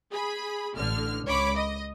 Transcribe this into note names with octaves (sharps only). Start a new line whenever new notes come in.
G#4 B5
A1 D3 F6
C#2 C#5 B5 D6
D#5